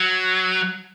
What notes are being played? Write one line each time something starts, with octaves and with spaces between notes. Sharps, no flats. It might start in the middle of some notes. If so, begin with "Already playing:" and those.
Already playing: F#3